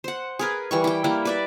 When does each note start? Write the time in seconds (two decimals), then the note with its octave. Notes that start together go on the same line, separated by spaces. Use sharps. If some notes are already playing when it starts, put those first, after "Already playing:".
0.04 C5 F#5
0.39 G#4 A#4 B4
0.71 E3 G3 C#6
0.84 E4 G5
1.04 G3 A#3 E4
1.25 B4 D5 E5